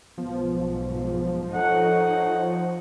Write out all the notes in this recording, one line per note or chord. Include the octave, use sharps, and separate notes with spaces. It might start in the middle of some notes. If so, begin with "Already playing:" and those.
B1 G#2 F3 B3
D#4 A4 C#5 F#5